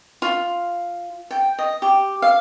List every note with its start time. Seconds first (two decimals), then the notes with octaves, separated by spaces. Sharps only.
0.22 F4
1.31 G5
1.59 D#5
1.82 G4
2.22 F5